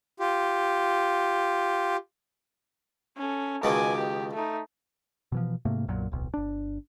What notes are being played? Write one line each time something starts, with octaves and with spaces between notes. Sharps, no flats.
F4 G4
C#4 A4
C#2 B2 D#3 G#5 D6
G4
A3 D#4
B2 E3 F3
G#2 C3 A3 A#3
B1 F#2 A#2 F#3
D1 B1
G1 D4